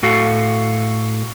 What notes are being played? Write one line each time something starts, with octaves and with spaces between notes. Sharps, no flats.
A2 F#4 A4 F5